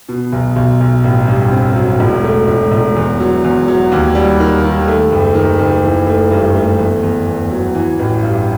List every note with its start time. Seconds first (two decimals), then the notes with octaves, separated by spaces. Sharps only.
0.09 B2
0.32 B1
0.56 B1
0.80 B1
1.04 A1
1.28 G2
1.52 C4
1.76 F#3
2.00 E1
2.24 A3
2.48 E1
2.72 E1
2.96 E2
3.20 F#3
3.44 E2
3.68 F#3
3.92 D#2
4.15 G3
4.40 D#3
4.64 D#3
4.88 A3
5.12 F#1
5.35 D#3
5.59 F#1
5.83 E3
6.07 A3
6.31 G2
6.55 A3
6.79 E2
7.03 E2
7.26 E2
7.51 F#3
7.75 E3
7.99 A1
8.23 G2